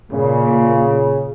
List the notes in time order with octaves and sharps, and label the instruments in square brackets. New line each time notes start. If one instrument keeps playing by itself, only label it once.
[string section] A#2 [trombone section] C#3